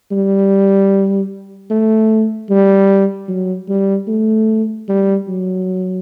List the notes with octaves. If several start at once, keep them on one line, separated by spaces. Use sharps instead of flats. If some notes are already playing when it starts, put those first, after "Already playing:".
G3
A3
G3
F#3
G3
A3
G3
F#3